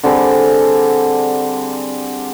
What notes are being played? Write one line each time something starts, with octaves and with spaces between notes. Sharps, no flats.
D3 G3 C4 G#4